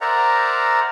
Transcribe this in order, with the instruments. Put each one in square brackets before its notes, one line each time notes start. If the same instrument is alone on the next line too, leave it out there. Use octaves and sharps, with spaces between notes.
[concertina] A#4 C5 D5 E5 F#5 A#5